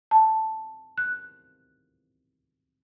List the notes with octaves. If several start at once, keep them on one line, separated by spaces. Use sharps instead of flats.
A5
F#6